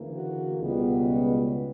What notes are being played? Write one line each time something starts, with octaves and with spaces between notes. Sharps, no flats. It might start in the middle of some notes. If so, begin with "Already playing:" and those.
Already playing: D2 C#3 E3 A#3
F#4
C#2 B2 G3 B3